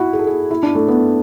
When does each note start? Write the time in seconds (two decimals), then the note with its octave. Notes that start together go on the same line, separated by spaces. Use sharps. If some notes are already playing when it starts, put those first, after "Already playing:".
Already playing: E4 F#4
0.13 G#4
0.19 A4
0.27 G#4
0.51 E4
0.63 D4
0.75 A3
0.88 B3